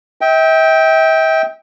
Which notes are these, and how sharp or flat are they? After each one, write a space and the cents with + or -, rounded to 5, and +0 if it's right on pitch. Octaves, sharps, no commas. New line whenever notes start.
E5 -40 G5 +0